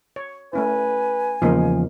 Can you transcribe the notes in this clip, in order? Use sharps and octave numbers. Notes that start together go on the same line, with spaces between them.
C#5
A3 C#4 E4 B4 G#5
E2 C#3 F3 G#3 A#3 D#4